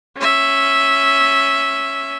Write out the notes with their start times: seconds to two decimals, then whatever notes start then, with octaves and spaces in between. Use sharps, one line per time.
0.17 C#4 E5